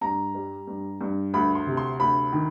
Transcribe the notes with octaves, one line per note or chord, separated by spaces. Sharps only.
G2 A#5
G3
G2
G2
D2 B5
C6
C3
C6
D2 B5
D#3